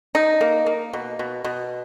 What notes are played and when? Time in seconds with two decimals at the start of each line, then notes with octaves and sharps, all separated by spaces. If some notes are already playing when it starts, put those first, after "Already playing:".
0.15 D#4
0.41 A#3
0.66 A#3
0.93 B2
1.19 B2
1.44 B2